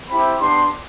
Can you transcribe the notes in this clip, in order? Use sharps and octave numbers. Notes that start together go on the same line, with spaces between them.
C4 E4 G4 B5
B3 D4 G4 C6